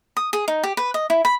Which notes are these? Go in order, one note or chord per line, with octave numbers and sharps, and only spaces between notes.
D#6
G#4
D#4
G4
B4
D#5
E4
B5